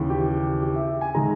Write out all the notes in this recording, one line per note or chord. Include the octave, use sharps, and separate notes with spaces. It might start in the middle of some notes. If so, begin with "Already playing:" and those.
Already playing: D#2 C#3 E3
G4
G4
E5
G#5
D#3 G#3 A#5